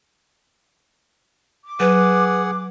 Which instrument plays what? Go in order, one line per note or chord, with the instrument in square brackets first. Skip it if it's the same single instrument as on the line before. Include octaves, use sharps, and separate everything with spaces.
[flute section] D6
[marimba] F#3 [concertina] G#4 F#5 [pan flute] B4